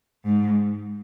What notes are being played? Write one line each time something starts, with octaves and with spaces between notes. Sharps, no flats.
G#2